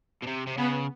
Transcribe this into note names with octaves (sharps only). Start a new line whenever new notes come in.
B2
C3
C3
C#3 B3